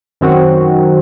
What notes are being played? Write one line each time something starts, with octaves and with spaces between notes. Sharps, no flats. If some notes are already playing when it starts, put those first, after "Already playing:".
F#2 D#3 F#3 C4 F#4